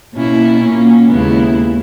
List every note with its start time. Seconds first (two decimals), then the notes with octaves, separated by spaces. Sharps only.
0.14 B2 A#3 C#4 E4
0.61 A#2 A#3 C#4
1.10 D#2 C#3 G#3 B3 E4